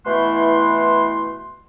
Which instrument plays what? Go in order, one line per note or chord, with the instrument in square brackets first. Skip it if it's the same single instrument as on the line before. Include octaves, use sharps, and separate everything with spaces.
[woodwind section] B2 E3 A3 E4 F#5 C6